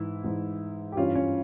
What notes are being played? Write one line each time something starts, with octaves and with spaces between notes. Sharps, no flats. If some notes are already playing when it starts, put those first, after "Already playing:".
Already playing: G#2 E3 E4
G#2 E3
G4
G2 E3 C#4 F4
C#4